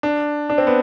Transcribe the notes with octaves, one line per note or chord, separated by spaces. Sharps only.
D4
D4
C4
B3